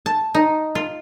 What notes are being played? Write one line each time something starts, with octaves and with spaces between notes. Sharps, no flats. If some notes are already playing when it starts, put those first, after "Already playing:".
A5
D#4
F4